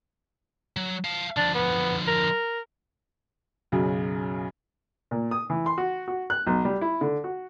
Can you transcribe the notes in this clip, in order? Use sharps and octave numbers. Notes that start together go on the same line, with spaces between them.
F#3
F5 A5
D3 F3 D4
B3
A#4
B1 F#2 C#3
A#2
D#6
E3
C6
F#4
F#4
F#6
B1
G3
E4
D3
F#4